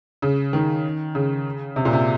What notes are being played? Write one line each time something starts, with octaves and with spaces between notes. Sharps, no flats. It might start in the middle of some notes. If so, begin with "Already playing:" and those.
C#3
D#3
C#3
C3
A#2
C3